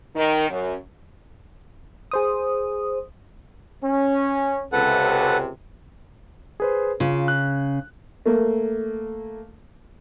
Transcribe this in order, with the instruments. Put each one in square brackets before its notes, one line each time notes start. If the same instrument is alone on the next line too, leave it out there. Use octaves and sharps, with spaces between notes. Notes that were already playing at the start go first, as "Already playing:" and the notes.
[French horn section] D#3
F#2
[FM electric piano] G#4 C5 D#6
[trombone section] C#4
[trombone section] C#2 C3 [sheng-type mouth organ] A4 B4 F#5
[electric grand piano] G#4 B4 C5
[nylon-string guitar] C#3 [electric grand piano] F4
[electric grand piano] F#6
[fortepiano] A3 A#3